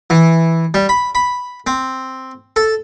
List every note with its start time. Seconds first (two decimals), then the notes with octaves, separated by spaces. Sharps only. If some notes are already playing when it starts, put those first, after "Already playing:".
0.10 E3
0.74 G3
0.89 B5
1.15 B5
1.67 C4
2.56 A4